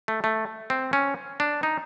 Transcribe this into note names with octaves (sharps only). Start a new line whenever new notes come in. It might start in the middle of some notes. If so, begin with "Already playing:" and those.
A3
A3
C4
C#4
D4
D#4